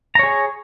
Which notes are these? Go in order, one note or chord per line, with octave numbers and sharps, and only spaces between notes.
G#4 C#5 A#5